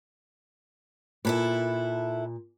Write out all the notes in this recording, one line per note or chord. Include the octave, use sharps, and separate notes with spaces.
A#2 E4 A4 B4